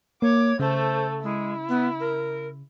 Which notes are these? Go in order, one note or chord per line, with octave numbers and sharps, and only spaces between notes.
A#3 C#5 D6
C#3 A3 A4 C5
G#3 E4
B3
A#4